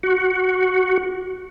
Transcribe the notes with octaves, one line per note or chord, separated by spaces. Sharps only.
F#4